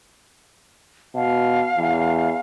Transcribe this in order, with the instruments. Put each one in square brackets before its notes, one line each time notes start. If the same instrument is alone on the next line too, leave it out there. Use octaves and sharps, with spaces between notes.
[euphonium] B2 [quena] F5
[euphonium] E2